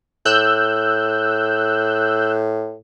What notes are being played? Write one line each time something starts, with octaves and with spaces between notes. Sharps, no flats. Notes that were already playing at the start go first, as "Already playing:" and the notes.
A2 E6 F#6 G6